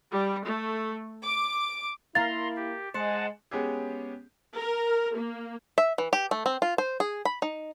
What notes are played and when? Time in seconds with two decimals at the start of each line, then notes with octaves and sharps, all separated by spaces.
0.12 G3
0.47 A3
1.22 D6
2.15 A#3 E4 A#4 F5 A#5 C6 A6
2.56 G4
2.94 G#3 C5 F#5 A5
3.51 G#3 B3 C#4 G4 G#4
4.55 A#4
5.16 A#3
5.78 E5
5.98 E3
6.13 G4
6.31 A3
6.46 C4
6.62 F4
6.78 C5
7.00 G#4
7.25 B5
7.42 D#4